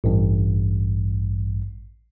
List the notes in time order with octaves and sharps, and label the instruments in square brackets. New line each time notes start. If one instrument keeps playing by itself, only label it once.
[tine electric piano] A1 G2